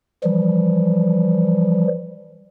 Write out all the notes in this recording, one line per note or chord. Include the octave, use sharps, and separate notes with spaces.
E3 F3 G3